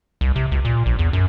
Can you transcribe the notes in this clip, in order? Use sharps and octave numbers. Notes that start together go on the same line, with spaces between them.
C2
C3
C#2
A#2
A#1
E2
F#2